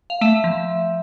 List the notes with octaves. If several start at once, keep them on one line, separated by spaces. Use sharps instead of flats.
F5
A3 E5
F3